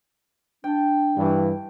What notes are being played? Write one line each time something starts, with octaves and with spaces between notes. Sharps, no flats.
D4 G5 A5
G2 E3